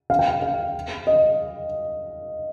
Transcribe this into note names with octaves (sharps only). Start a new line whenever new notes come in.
F5
G5
F5
F5
D#5